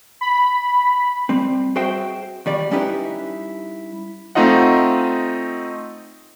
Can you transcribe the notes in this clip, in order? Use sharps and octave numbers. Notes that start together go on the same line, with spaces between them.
B5
G3 C4
F#4 G#4 C5 E5 G5
D#2 G3 D5
G3 C#4 D#4 E4 G4 B4
A3 C4 D#4 F4 D#5 F#5